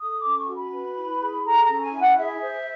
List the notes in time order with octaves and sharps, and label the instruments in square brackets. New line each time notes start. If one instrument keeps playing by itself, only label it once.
[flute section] A4 D#6
D6
C#4
C#6
F#4
B5
B4
E4
G#4
A4 A#5
A#5
C#4
G#5
E4
F#5
G#4 E5
C5